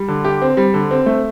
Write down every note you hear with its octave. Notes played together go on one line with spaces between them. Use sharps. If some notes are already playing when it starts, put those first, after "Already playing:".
Already playing: G3
D3
G4
C4
G3
D3
C4
A3